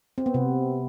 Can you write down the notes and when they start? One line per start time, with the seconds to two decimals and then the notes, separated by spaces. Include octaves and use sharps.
0.18 C4
0.26 B3
0.34 C3